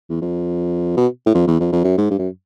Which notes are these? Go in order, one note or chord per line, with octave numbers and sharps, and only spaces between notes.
E2
F2
B2
A2
F2
E2
F2
F2
F#2
G#2
G2
F#2